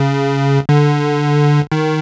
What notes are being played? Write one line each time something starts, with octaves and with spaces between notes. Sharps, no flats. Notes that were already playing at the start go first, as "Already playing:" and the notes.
Already playing: C#3
D3
D#3